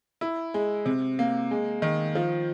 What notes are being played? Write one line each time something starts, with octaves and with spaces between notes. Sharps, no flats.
E4
G#3
C3
A#3
G#3
D#3
F3